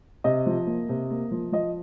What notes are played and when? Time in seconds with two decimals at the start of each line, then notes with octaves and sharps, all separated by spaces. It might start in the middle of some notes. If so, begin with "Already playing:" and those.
0.24 C3 D#5
0.46 F3
0.67 A#3
0.89 C3
1.11 A#3
1.31 F3
1.52 F3 D#5